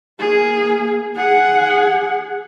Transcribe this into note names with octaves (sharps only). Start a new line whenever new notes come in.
A#3 G#4
G#4 F#5